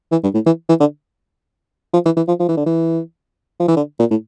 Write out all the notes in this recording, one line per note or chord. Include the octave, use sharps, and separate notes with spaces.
E3
G2
A2
E3
E3
D3
F3
E3
E3
F3
F3
E3
D3
E3
F3
E3
D3
A#2
A2